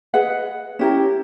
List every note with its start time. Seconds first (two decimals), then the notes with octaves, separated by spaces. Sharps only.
0.14 G#4 B4 D#5 F#5
0.79 C#4 E4 G4 A#4